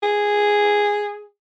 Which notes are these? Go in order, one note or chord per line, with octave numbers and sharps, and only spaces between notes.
G#4